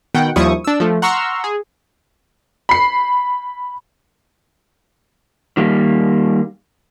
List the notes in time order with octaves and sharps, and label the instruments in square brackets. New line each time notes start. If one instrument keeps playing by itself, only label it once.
[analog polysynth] B2 D#3 F#5 G5
D#2 F3 G3 E4 C#6 D#6
D4 E6
F3 A3
F#5 A#5 C6 C#6 E6 F6
G#4
[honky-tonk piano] B5 C7
[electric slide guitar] D#3 G3 A#3